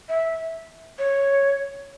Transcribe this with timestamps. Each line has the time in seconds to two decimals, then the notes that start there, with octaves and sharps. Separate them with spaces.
0.09 E5
0.98 C#5